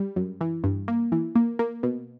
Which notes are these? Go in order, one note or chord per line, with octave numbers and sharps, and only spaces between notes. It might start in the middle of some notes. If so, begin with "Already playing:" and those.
Already playing: G3
F#2
E3
G2
A#3
E3
A#3
A#3
B2